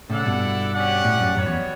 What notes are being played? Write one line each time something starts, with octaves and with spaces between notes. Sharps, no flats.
A2 C#3 E4 A4 D5 F#5
G2 B2
C#4 G4 D5 F#5
A2
F#2
F#2 G3 B3 F#4 C#5
E2